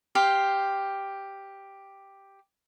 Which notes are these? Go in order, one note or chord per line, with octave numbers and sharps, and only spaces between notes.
G4 C5 F5